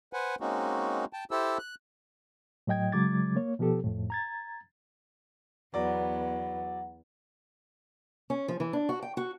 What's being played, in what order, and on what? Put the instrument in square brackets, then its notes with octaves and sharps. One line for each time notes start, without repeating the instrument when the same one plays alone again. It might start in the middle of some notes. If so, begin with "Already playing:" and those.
[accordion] B4 C5 F#5 G#5
G#3 A#3 C4 C#4 D#4 F#4
G5 A5
E4 G4 A4 C5 A5 E6
F#6
[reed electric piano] A2 F#3 D#5 G5 G#6
C#3 F#3 G#3 D6 G#6 A6
A#3 C#5
B2 F3 B3 G4 A4
F2 A2
A#5 G#6 A6
[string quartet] E2 B3 [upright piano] F#3 D5 [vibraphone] F#5
[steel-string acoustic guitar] C#4
F3
E3
D4
F#4
G5
F#4